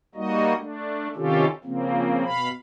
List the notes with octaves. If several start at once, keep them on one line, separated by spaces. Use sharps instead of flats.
G3 A#3 D#4 F#4 D#5
A3 D4
C3 D#3 C#4 F4 G4 A4
C#3 F3 A#3 C4
B2 F5 B5